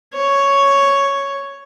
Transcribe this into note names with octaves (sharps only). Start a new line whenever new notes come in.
C#5